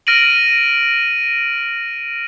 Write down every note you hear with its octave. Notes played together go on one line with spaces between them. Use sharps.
F6 A#6 D7 D#7 F#7